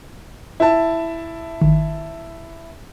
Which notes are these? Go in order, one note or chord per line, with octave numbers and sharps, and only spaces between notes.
E4 A5
G#1 D#3